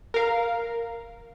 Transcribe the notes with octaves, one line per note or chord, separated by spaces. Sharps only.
A#4 F5